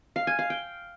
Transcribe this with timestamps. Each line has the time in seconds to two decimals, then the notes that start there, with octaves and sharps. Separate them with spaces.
0.16 F5
0.27 G#5
0.39 F5
0.50 G5